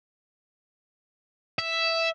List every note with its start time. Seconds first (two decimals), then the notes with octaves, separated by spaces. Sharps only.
1.59 E5